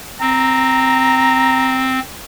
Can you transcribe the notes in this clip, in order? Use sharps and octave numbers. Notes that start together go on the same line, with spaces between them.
C4 A#5